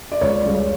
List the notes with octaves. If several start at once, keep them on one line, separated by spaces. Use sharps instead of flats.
D5
C#2 C#5
C#3 G3